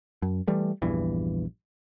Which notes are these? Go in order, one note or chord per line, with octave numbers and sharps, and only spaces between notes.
F#2
E3 G3 A3
A#1 E2 G2 E3